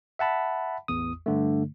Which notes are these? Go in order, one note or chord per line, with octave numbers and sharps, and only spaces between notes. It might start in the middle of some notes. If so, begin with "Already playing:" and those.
E5 F#5 A5 B5
A1 E2 D#6
G2 D3 A3